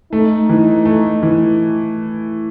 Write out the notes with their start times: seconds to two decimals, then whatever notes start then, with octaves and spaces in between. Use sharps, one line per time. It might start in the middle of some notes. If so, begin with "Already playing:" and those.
0.12 A3 D#4
0.50 E3
0.85 A3
1.23 E3